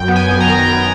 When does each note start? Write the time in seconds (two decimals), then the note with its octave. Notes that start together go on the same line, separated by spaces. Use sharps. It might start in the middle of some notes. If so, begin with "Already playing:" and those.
Already playing: F#2 G5
0.08 B3
0.16 G#5
0.29 F#2
0.40 A#5
0.48 D#3
0.68 D#3